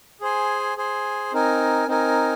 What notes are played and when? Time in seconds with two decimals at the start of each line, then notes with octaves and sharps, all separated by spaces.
0.21 G#4 C5 G#5
0.77 G#4 C5 G#5
1.33 C4 D#4 A#4 G#5
1.88 C4 D#4 A#4 G#5